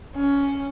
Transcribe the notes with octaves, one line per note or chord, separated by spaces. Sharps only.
C#4